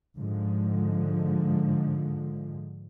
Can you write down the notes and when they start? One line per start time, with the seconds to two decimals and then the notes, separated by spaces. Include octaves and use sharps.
0.16 G#2 D3 F3 G#3